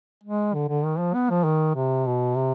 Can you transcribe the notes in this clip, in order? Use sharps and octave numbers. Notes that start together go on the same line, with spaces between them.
G#3
D3
D3
D#3
F3
B3
F3
D#3
C3
B2
C3